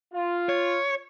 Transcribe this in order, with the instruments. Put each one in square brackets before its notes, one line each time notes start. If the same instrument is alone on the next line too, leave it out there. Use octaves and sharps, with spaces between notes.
[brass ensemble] F4
[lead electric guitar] C#5